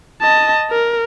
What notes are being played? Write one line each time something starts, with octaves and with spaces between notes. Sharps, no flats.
D#5 A5
A#4